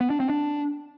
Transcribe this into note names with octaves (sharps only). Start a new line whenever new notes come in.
B3
D4
C4
D4